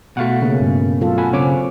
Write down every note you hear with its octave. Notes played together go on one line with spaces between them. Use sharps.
B2 A3 F#4 F5 F#5
C#3 A#3 C#4
G2
F#3 F4 A4
F#5 G#5 B5
C#3 C4 C#5 G#5 D6